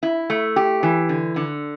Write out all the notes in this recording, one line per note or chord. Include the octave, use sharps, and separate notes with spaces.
E4
A3
G4
E3
D3
D3